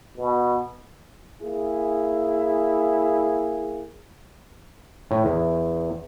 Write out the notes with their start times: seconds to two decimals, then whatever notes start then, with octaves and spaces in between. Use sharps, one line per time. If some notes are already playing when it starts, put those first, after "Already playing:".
0.17 B2
1.42 A#3 E4 G#4
5.11 A2
5.25 E2